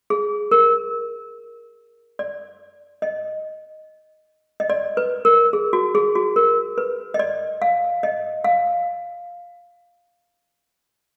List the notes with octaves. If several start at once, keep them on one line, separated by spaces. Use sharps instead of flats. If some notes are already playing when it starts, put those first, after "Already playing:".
G#4
A#4
D5
D#5
D#5
D5
B4
A#4
G#4
F#4
G#4
F#4
A#4
B4
D#5
D5
F5
D#5
F5